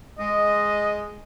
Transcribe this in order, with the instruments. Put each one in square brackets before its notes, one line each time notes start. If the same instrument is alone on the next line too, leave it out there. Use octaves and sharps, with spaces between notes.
[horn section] G#3 [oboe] D#5